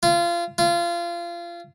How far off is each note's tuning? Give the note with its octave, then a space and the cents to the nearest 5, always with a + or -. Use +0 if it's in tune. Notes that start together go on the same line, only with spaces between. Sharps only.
F4 -25
F4 -25